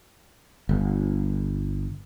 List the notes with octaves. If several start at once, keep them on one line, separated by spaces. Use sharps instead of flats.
G1